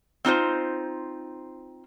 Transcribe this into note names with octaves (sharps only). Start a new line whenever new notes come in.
C4 D#4 F4 C5